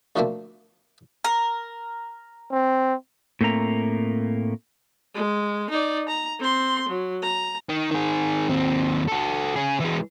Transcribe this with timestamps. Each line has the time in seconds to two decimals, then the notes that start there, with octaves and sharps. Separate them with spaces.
0.16 D2 D3 F3 A3 A#3 C4
1.24 A#4
2.52 C4
3.41 A2 A3 A#3 C4 A#5
5.15 G#3
5.70 D#4 D5
6.08 A#5
6.40 C4 C6
6.88 F#3
7.23 A#5
7.69 D#3
7.91 D#3 G#4
8.49 D#2 C4
9.08 F#4 A4
9.56 C#4 G#4
9.80 E3 G#3